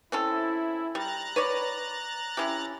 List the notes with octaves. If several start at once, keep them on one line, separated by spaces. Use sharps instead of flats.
C4 C#4 E4 A4
G3 A#5 F#6 A6
B4 C#5 D5
C#4 E4 G4